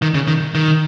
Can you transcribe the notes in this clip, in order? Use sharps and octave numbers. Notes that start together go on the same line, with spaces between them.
D#3
C#3
D#3
D#3